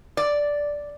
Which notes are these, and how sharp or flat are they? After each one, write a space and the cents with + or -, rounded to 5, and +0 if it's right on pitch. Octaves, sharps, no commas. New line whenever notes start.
D5 -5